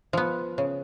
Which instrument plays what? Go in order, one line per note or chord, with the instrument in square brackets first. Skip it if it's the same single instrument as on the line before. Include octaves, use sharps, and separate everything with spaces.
[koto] F3 B3
C#3